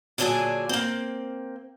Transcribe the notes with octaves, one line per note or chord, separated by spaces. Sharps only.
A#2 D3 F#3 D4 G#4 G#5
A#3 C4